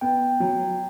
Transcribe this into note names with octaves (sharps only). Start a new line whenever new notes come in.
B3 G5
F#3